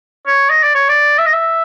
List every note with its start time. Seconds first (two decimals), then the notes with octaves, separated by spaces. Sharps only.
0.27 C#5
0.50 D#5
0.63 D5
0.75 C#5
0.89 D5
1.19 E5
1.26 D#5
1.33 E5